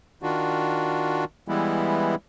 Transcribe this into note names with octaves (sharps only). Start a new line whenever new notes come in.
D#3 D4 F4 F#4
E3 G3 G#3 B3 E4